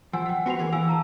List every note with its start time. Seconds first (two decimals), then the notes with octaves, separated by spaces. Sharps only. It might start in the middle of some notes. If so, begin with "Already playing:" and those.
0.13 F3 F#5 G#5 E6
0.26 F#5 G5
0.46 B3 F#4 C5 F#5 F7
0.59 E3 A#3 G#4
0.72 E3 F5 G#5 E6
0.87 A5 A#5 E6